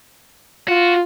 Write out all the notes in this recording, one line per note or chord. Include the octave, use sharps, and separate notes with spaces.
F4 F#4